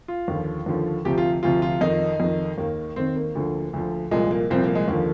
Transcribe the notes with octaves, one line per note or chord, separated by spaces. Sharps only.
F4
D#2 D3 F3
D#2 D3 F3
D2 C3 F3 G4
F4
D2 C3 F3 F4
F4
F2 D#3 D#4
F2 D#3
D#2 D#3 A#3
D#2 D#3 C4
A#3
D2 D3 F3
D2 D3 F3
C2 A#2 F3 G#3
A#3
C2 A#2 F3 C4
A#3
G#3
D#2 D3 F3 A#3